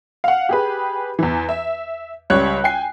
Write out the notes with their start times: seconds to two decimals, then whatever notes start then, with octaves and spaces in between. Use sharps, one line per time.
0.24 F5 F#5
0.49 G4 G#4 B4
1.19 E2 E3
1.49 E5
2.30 C#2 G3 C#5 F#6
2.64 G5 G#5 C7